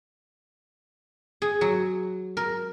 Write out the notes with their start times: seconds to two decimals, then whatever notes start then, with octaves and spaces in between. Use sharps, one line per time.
1.42 G#4
1.61 F#3
2.37 A#4